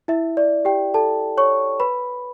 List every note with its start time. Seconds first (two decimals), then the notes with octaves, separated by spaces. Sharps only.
0.08 E4 E5
0.37 D5
0.65 G4 G5
0.94 A4 A5
1.37 C#5 C#6
1.80 B4 B5